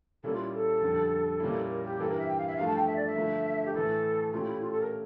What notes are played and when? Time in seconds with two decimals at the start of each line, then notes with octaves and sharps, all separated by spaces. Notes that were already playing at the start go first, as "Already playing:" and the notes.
0.24 A#2 G3 A#3 C#4 E4 A4
0.33 F4
0.53 A4
0.82 F2 D3 G3
1.40 A#2 G3 A#3 C#4 E4
1.70 A#4
1.85 G4
1.99 G2 E3 A#3 E4 G4 A4
2.09 A#4
2.18 E5
2.28 G5
2.38 F5
2.47 E5
2.57 G2 F3 A3 F5
2.68 A5
2.77 G5
2.87 E5
2.96 D5
3.06 E5
3.15 G2 D3 F3 A3
3.66 G4
3.74 A2 E3 A3 A4
4.32 A#2 A3 C#4 F4 G4
4.47 E4
4.62 F4
4.72 A4
4.81 A#4